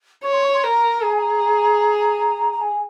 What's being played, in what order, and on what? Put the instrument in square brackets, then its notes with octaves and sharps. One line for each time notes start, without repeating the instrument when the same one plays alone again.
[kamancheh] C#5 [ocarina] C#6
[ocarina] C6
C#6
C6
[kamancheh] A#4 [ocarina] A#5
[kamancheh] G#4 [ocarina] A#5
[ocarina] G#5
A#5
A#5
G#5